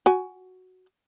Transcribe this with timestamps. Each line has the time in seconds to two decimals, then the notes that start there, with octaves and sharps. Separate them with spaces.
0.06 F#4 G#5